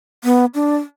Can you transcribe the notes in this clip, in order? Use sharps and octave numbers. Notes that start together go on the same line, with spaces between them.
B3
D4